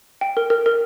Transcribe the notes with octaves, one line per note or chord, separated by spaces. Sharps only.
G5
A#4
A#4
A#4